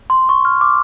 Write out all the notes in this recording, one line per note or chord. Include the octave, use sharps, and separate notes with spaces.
C6
C#6
F6
D6